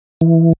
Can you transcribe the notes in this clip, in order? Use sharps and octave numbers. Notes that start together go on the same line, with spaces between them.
E3